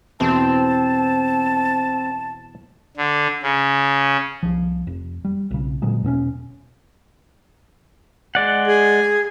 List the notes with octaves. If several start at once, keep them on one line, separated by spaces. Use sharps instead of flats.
E2 B2 C4 E4 A5
D3
C#3
C2 F3
F1
G3
B1 C#3
A#2 D3 F#3 G#3
E2 B2 C4 C#4
G#3 D5 F#5
G#4